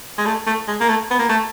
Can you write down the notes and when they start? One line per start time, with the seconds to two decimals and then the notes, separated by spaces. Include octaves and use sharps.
0.18 G#3
0.26 A3
0.46 A3
0.68 G#3
0.80 A#3
0.89 A3
1.11 B3
1.19 A#3
1.29 A3